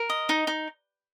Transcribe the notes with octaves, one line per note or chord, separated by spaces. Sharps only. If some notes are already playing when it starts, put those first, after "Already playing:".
Already playing: A#4
D#5
D#4
D#4